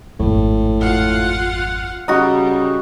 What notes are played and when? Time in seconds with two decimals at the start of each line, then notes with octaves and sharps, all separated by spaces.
0.19 G#1 F2 A2
0.79 F4 F5 F#5
2.08 C#3 G3 D#4 F#4